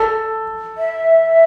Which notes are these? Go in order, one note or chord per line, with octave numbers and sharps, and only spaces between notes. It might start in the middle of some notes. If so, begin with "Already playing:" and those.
Already playing: A4
E5